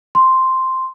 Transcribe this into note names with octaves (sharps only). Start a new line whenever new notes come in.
C6